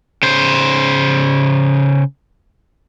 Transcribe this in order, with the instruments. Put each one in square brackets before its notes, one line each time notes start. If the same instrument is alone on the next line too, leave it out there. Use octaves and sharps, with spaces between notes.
[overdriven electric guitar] C#3 C5